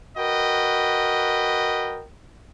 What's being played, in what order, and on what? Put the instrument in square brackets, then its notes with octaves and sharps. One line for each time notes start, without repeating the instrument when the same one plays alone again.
[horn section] F#4 A#4 B4 D#5 G5